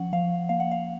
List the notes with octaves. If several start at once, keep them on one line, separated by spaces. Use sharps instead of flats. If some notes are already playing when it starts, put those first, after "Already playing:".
Already playing: F3 C#4 F#5
F3 F5
A#3 F5
F#5
F5